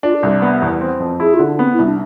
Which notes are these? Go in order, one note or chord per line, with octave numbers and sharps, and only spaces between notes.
D4 F4
A4
C2
B3
E2
C4
F2
E4 G#4
F4
D3
D4
B3 C4
E4
C2
D4